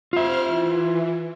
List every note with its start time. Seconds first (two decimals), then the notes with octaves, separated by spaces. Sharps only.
0.13 F4 C5 E5 F6
0.45 E3